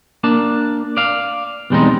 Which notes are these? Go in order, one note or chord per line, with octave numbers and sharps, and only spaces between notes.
A#3 D4 A5
D5 F5
B1 E2 G3 G#3 C4 D#4